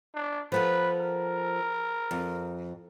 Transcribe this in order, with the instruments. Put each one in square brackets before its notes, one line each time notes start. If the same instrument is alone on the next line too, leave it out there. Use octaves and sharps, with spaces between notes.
[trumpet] D4
[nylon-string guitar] F3 B3 A4 [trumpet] B4
[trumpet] A#4
[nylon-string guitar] F2